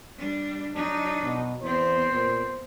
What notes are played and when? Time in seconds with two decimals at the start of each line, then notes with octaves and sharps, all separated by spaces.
0.18 G3 D4
0.75 F#3 D4 D#4
1.24 B2
1.62 E2 B3 C4 C5
2.13 A#2